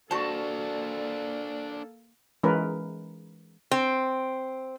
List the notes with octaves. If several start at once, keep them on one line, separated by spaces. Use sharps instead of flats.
A#3 D4 F#4 A4 C5 D5 A5
E3 G#3 C#4 A#4 B4
C4